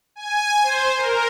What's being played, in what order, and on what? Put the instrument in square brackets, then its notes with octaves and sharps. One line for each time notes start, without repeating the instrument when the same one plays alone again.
[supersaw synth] G#5
C5
A#4